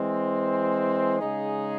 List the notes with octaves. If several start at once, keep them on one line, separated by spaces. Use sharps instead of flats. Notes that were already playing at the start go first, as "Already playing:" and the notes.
Already playing: E3 G#3 C4
C#3 G#3 D#4 G#4